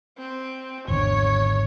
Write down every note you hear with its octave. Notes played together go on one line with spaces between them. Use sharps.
C4
G#1 E2 D3 C#5